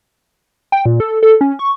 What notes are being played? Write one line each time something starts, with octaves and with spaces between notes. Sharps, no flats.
G5
A#2
A4
A4
C#4
C#6